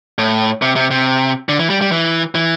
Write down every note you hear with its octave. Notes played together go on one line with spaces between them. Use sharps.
A2
C3
C3
C3
D3
E3
G3
G3
E3
E3